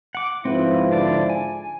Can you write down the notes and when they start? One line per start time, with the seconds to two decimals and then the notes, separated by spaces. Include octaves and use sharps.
0.15 F#5 D6
0.45 G#2 F3 C4 E4 B4
0.91 D3 D4 D5
1.30 G#5